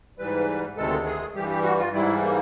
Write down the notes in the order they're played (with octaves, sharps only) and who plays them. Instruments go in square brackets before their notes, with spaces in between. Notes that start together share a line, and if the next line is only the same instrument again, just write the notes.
[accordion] G#2 E3 G3 B4
D2 C3 D#3 G#3 A4
G#4
G2 E3 G3 G4
G4
F#4
F4
G#2 E3 G3 E4
A#3